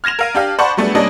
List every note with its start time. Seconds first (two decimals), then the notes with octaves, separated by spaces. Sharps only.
0.04 F6 G#6 A#6 E7 F7
0.19 A#4 F5 D#7
0.34 D4 G4 F5
0.59 C5 D5 F#5 A5 B5 C#6
0.77 F#3 G3 A3 B3 D4 G#4
0.95 G3 A#3 C#4 D4 D#5